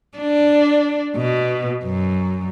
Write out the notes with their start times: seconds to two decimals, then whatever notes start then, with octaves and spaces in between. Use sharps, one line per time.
0.18 D4
1.16 B2
1.84 F#2